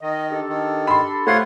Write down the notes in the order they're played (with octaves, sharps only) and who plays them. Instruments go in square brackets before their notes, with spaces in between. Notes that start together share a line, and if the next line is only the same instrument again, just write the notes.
[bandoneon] D#3 [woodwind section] D#5
[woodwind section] D4 G4 A4
[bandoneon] D#3
[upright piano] B5 C6
[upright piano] A3 C7 [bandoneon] F4 C#5 F#5 [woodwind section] G4 C5 B5